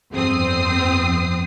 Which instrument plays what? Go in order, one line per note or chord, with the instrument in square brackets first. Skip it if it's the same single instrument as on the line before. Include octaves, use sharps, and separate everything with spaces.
[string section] G1 F2 C4 D#6 C7